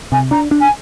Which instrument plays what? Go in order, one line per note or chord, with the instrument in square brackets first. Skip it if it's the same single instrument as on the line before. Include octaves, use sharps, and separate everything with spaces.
[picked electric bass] C3 [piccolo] G#5
[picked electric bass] D4 [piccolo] A#5
[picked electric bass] D4
[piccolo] G#5